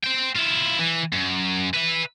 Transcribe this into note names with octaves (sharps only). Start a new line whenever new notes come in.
C5 G5
E4 F4
E3
F#2
B4 E5